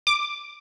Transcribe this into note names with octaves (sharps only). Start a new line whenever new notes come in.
D6